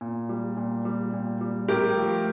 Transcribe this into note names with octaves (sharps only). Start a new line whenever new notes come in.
A#2
G3
A#2
G3
A#2
G3
A2 G4 A#4
F3